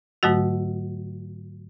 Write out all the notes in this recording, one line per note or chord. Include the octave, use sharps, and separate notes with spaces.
G#2 D3 F#3 A3 F#4